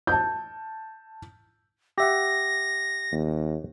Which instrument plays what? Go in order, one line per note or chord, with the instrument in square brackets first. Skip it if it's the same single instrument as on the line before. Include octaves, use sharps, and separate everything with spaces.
[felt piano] A5 G6
[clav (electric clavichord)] G4 E5 F#5 [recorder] A#6
[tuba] D#2